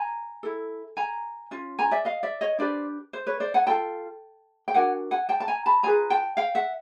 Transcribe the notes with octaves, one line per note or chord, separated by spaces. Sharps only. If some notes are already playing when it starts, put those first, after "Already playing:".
Already playing: G#5 A#5
E4 A4
G#5 A#5
C#4 F4
G#5 A#5
D5 E5
D#5 F5
D5 E5
C#5 D#5
D4 G4 B4 C5 D5
C5
B4 C#5
C5 D5
F#5 G#5
F4 A4 G5 A5
G5
D4 F#4 A#4 F#5 G#5
F#5 G#5
G5 A5
A5
G#5 A#5
A5 B5
F4 G#4 B4 G#5 A#5
G5 A5
F5 G5
E5 F#5